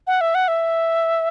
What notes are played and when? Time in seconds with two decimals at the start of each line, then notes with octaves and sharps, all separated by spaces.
0.07 F#5
0.21 E5
0.35 F#5
0.48 E5